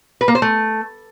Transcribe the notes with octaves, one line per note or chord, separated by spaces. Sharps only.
B4
A#3
C5
A3